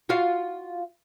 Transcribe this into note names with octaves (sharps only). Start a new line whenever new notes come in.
F4 F#4 F5